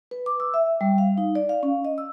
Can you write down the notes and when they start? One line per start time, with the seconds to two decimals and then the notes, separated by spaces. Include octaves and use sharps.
0.11 B4
0.26 D6
0.40 E6
0.54 E5
0.81 G3
0.98 F5
1.18 D#4
1.35 D5
1.49 F5
1.63 C#4
1.85 D#5
1.98 E6